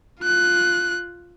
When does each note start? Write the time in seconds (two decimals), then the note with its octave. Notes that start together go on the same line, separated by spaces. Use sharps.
0.22 F4 F#6